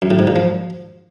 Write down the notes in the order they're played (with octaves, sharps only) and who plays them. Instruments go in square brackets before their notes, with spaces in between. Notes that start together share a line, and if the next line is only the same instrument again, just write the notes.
[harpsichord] F#2
A2
G#2
A#2
F3